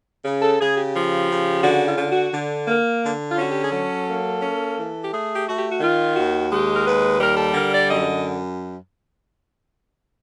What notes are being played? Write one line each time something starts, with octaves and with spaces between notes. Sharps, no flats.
C#3
A4
C#3 G#4
G4
F3
C#3
D3 F#4
F4
D3
F#4
D3
A#3
D3
F4
C#4 F#4
G4
G#4
F#3 A4
A#3
C#4
E3
G4
A3 G#4
G4
A3 F#4
G4
F#4
D#3 F4
D#2 F#4
G#3 G4
A#4
D#2 B4
G3 A#4
A4
D3 A#4
D5
F#2 D#5